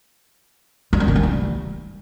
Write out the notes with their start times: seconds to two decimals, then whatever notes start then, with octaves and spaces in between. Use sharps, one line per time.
0.93 G3
1.00 C#4
1.08 D#3
1.16 E3
1.23 G3